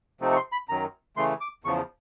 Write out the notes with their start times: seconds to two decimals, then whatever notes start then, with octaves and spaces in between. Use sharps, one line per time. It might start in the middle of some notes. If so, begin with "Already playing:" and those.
0.21 C3 F3 A3 C4 D#4
0.32 C#6
0.36 C6
0.52 B5
0.69 F#2 D#3 F#3 A#5
1.16 C#3 E3 A3 C6
1.41 D6
1.64 E2 C#3 F3 C#6